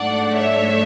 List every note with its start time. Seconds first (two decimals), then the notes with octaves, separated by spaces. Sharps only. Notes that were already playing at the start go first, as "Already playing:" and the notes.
Already playing: G#2 F#3 A3 D4 D5 F#5
0.36 C#5 E5